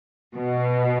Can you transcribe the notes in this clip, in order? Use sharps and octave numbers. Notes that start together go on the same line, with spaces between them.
B2